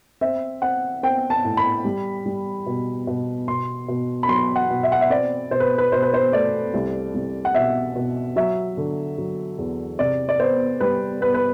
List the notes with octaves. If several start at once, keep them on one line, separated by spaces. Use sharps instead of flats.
C4 E5
C4 F#5
C4 G5
A5
A2
B5
G3
G3
B2
B2
B2 C6
B2
B5
F#3 C6
F#5
B2
E5
F#5
E5
C4 D5
B2 C5
B4
B4
B2 C5
B4
C5
A3 D5
C2
C2
F#5
B2 E5
B2
F#3 E5
D3
F#3
E2
C3 D5
D5
B3 C5
G3 B4
B3 B4
B4